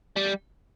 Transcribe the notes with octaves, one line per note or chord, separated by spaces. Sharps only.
G3